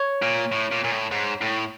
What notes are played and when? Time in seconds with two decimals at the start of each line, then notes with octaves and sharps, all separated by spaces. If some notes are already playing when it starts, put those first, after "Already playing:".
Already playing: C#5
0.22 A#2
0.52 A2
0.72 A#2
0.84 A#2
0.92 A2
1.11 G#2
1.41 A2